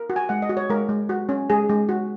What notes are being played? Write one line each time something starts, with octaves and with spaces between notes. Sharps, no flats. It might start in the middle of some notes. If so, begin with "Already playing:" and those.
Already playing: A#4
F#4
G#5
G#3 F#5
D#5
F#4
C#5
G#3 A#4
G#3
F#4
C#4
G#3 G#4
G#3
F#4